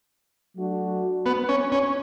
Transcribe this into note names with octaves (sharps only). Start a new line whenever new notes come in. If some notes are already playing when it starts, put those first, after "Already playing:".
F#3 A3 D4 F#4
B3
C#4
C#4